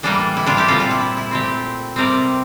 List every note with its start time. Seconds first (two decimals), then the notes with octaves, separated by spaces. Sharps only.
0.03 A2 E3 G3 A#3 D4
0.37 E4
0.46 D4 F4
0.57 E4 G4
0.68 A#2 G3 C4 F4 A4
0.79 D4 F4
0.91 E4
1.01 E4
1.17 E4
1.31 A#2 A3 C4 E4 G4
1.96 C3 G3 C4 A#4 D5